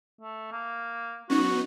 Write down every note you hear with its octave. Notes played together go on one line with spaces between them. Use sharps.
A3
A#3
F#3 B3 C#4 D#4 F#4